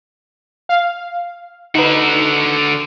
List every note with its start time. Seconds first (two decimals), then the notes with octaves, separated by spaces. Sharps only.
0.69 F5
1.75 D3 D#4 F#4 B4